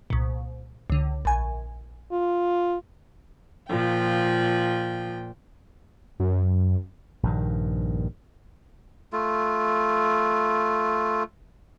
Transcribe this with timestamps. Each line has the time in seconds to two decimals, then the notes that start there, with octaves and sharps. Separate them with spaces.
0.10 C2 A#2
0.90 C#2 D3
1.25 A#1 G#5
2.12 F4
3.68 A#2 F3 G5
6.20 F#2
7.23 A#1 G2 D#3
9.13 A3 F4